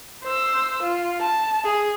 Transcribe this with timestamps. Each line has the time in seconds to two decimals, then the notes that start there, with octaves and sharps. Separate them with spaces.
0.24 C5 E6
0.82 F4
1.21 A5
1.64 G#4